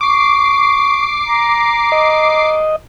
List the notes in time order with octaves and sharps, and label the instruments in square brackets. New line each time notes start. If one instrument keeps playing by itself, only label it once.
[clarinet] C#6 [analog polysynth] D6 C7
[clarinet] A#5
[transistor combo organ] D#5